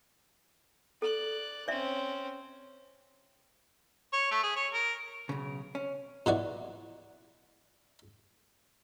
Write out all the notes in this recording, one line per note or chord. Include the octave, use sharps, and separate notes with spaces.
A4 D5 F#6
C4 C#4 D5 E5
C#5
A3
G#4
C#5
A#4
B1 C#3
C#4
B2 E3 F#4 D5